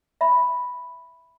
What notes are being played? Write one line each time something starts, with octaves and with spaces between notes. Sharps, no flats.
E5 B5